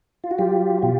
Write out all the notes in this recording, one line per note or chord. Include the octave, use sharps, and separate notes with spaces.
F4
F#4
F#3 F4 G4
F#4
B2 F4 G4